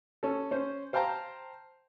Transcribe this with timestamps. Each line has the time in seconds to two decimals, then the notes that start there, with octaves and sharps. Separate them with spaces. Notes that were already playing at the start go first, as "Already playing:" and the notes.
0.23 C#4 A4
0.51 C#4 C5
0.93 C5 F5 G5 A5 A#5